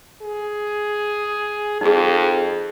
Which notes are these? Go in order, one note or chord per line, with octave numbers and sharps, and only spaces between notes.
G#4
F2 D#4 G#4